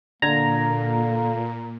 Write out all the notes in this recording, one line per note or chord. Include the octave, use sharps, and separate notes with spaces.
A#2 D3 A#3 A#5 G#6